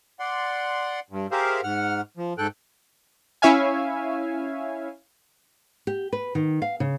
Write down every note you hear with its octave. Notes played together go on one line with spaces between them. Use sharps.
D5 F#5 C6
G2
G4 G#4 A#4 C5 E5 F5
G#2 F#5 F6
F3
G#2 A4 G5 F#6
C#4 E4 C#5 E5 F5 G#5
G4
B4
D#3
F5
C#3